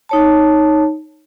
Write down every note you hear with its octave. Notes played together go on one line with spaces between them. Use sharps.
D#4 C#5 A5